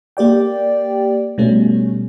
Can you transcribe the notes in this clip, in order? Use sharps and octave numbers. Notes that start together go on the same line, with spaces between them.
A#3 G4 D5 G5
B2 G3 A3 C#4